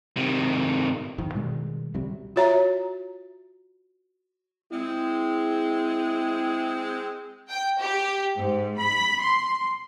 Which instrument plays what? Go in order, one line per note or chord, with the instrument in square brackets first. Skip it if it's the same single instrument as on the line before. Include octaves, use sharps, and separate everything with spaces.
[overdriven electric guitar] C3 D#3
[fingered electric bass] G1 F2 D#3
B2 D#3 G3 G#3
C#2 C3 F#3 G3
[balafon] F4 F#4 C#5 E5 A#5
[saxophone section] G#3 C4 [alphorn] E4
[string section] G5
G4
G#2
B5
C6